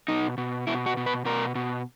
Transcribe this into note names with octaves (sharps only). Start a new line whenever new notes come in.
B2 D#4
B2
B2 E4
F#4
B2
B4
B2 A#4
B2